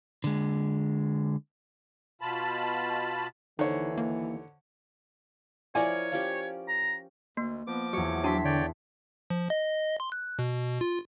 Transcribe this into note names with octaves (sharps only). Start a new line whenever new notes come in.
D3 G#3
B2 F4 A5 B5
D#2 D3 E3 D#4 C5 C#5
A#3
F3 E4 A#4 C#5 D5 G#5
F3 C#4 G4
A#5
D2 A#3
F3 B3 D6
E2 F#3 C#5
D4 A5 C6 B6
D3 C#5 D5 G5
F3
D#5
C6
F#6
B2
F4